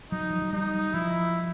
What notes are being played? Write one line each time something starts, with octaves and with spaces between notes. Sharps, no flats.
F#3 D#4
F3
F#3
G3 D#4
F3 E4